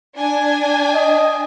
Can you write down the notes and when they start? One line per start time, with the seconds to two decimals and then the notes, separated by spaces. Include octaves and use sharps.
0.17 D4 G#5
0.95 D#5